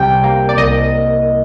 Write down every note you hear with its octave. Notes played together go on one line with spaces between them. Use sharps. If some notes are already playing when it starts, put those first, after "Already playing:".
Already playing: C2 C3 G3 G5
A#3
D5
C2 D#5